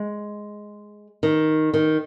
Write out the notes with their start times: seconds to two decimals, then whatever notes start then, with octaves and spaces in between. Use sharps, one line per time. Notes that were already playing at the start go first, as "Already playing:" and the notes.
Already playing: G#3
1.23 D#3
1.74 D#3